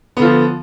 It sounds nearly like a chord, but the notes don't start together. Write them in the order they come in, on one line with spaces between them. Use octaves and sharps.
B3 D3 F4 F3